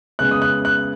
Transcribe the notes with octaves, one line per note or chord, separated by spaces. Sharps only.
C#3 G#3 B3 F#6
D#6
F#6
F#6